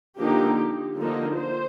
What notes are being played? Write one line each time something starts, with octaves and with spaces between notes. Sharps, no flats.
D3 F3 A#3 D#4 G4
D3 F3 A#3 D#4
C5